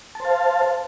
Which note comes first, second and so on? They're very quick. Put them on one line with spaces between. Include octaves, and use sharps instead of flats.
A5 C5 F5